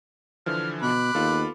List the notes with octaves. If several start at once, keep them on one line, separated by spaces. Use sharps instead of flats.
D3 E3 F3 F6
B2 B5 D6 F#6
D#2 B3 F4 A4